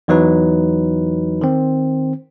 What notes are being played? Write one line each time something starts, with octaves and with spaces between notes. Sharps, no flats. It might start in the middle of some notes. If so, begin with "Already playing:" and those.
E2 E3 F#3 D#4 B4
D#3 C4